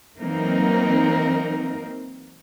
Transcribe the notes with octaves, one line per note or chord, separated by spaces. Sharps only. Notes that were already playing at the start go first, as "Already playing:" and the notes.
E3 F#3 A#3 C4 D#4 A#4